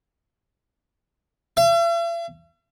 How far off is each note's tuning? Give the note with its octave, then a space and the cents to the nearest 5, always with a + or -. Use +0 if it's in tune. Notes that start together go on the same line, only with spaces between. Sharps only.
E5 +45